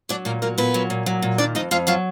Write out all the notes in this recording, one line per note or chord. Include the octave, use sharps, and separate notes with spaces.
F#3 D4 D5
A#2 A#3 A#4
F#3 A#3 A#4
A#2 B3 B4
F#3
A#2
F#3
A#2
D#3 D4 D5
F2 D#4 D#5
F2 F4 F5
F#3 F4 F5